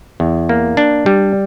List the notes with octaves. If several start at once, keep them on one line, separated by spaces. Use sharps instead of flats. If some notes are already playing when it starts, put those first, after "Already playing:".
E2
A#3
D4
G3